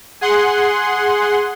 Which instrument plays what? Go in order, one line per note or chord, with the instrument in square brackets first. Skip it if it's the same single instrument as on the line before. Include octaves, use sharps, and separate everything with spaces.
[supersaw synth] G#4 F#5 C6